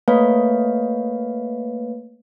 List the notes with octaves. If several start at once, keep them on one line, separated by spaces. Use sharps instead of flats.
A3 A#3 B4 C#5 F5